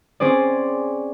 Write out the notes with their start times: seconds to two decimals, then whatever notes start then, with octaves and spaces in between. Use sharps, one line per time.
0.20 C4 C#4 G#4 C5 D5